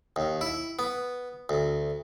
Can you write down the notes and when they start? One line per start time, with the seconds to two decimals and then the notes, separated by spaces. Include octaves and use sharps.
0.16 D#2
0.41 E4
0.79 B3
1.49 D2